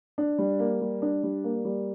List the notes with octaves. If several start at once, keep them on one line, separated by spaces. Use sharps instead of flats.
D4
G3
A#3
G3
D4
G3
A#3
G3